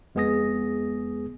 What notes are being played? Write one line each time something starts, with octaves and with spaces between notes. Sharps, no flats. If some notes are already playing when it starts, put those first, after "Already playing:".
F2 G#3 B3 G#4 D#6 A#6